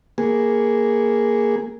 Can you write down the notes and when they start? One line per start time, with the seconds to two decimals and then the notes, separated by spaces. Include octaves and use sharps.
0.18 A#3 G#4